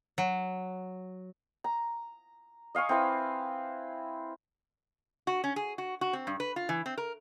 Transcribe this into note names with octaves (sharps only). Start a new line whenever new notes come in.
F#3
A#5
D#5 F5 G#5 C#6
C4 E4 B4 F5
F#4
C#4
G#4
F#4
F#4
C4
G2
B4
F4
E3
C4
A#4